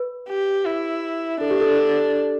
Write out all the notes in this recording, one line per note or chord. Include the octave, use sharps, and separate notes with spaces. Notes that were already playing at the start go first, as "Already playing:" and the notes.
Already playing: B4
G4
E4
D4 A4
G4
A4